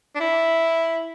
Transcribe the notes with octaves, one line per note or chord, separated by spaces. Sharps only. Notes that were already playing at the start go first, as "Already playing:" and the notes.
D4
E4